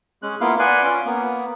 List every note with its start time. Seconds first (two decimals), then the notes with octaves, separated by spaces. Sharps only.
0.23 G#3 C#4 F#6
0.41 A#3 B3 E4 F4 F5
0.59 B4 D5 F#5 G#5 C6
0.83 C#4 F4
1.06 A#3 B3